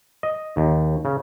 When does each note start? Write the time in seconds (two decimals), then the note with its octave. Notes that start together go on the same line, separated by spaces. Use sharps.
0.23 D#5
0.57 D#2
1.05 C#3